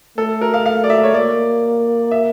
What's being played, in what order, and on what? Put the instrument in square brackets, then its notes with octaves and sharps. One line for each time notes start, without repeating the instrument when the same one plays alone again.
[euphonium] A3 [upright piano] A4
[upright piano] A#4
F5
F5
D5
E5
C#5
[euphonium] A#3 [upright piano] D5
[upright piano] E5